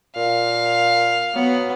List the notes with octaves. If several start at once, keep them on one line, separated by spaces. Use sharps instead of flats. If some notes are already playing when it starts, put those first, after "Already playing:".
A#2 F5
F#3 B3